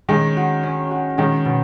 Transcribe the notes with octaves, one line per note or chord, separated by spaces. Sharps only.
D#3 G#3 C#4
F#4
C#4
F#4
D#3 G#3 C#4
B2